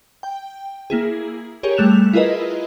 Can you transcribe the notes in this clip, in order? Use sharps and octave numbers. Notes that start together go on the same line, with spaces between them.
G5
A#3 E4 G#4
G4 G#4 A#4 C#5
G3 A3 F#6 E7 F7
E4 F4 G#4 A#4 B4 D#5